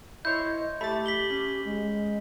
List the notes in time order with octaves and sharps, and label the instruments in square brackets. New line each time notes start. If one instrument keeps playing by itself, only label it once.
[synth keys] E4 C5 C#5 [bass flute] D#5 [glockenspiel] G6
[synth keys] A3 A6 [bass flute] G4 [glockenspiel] B5
[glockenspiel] B6 F#7 G7
[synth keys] C#4
[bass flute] G#3